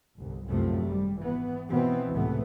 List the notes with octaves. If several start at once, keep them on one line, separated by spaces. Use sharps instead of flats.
G1 C2
C2 F#2 A2 C3 F3 A3
G#1 G#2 G3
E3 B3
B2 E3 B3 C4
C#2 A2 C3 E3 A3 B3